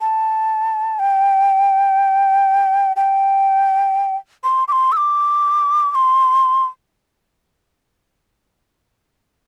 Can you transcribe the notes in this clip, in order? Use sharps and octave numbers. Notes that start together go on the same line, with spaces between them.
A5
G5
G5
C6
D6
C6
E6
D6
D6
C6